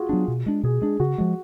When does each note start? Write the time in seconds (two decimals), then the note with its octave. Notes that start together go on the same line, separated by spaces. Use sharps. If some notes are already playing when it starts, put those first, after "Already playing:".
Already playing: F4 F#4 G#4
0.09 F#3 B3 D4
0.28 B2
0.46 G#3 D4
0.63 B2 G#4
0.81 G#3 D4 G#4
1.00 C#3 F#4
1.18 F3 G#3